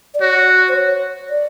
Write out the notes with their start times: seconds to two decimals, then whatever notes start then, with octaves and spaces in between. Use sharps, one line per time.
0.14 D5
0.21 F#4 C#5
0.68 C5
0.75 C#5
1.30 D5